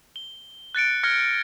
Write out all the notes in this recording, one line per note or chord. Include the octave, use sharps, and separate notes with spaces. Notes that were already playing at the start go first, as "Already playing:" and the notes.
G7
F#6 A6 C#7 D7
F6 G#6 A#6 C#7